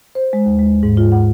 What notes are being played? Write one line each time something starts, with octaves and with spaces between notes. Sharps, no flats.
C5
G#3
D#2
G#3
G#2
F4
F#5